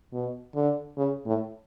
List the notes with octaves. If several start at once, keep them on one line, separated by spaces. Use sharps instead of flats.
B2
D3
C#3
A2